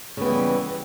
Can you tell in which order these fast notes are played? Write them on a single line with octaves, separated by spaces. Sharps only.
C#3 B3 E3 G3